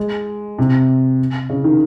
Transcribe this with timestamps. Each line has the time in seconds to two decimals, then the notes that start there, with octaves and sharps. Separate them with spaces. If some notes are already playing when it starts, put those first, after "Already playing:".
Already playing: G#3
0.59 C3
1.49 C#3
1.64 D#3